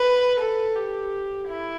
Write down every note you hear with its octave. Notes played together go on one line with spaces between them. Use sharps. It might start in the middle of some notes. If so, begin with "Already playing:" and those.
Already playing: B4
A4
G4
E4